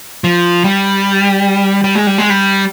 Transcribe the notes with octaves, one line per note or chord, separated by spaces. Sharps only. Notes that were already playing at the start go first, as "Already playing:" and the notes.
F3
G3
G3
G#3
G3
G#3
G3